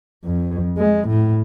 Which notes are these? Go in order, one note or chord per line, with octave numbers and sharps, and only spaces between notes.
F2
G#3
A2